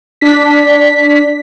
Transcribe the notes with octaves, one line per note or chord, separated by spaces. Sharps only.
D4 B6